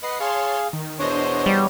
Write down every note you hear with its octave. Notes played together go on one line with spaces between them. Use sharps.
B4 D#5 F#5 C7
G#4 C#5 F5 A5 C6
D#3
E2 B2 D4 C5 C#5 D#5
G3